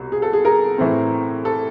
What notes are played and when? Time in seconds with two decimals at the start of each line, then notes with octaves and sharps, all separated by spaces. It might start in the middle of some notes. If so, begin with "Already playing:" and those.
Already playing: C2 B2
0.12 G#4
0.22 A4
0.33 G#4
0.45 G#4 A#4
0.78 A2 E3 A3 C4
1.45 A4